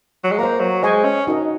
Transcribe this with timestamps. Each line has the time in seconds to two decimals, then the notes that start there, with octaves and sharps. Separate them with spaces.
0.24 F#3
0.31 G#3
0.38 A#3 C5 F5 A#5
0.60 F#3
0.83 G#3 C5 D#5 G#5 C#6
1.05 C#4
1.27 D#4 F#4 A#4 D#5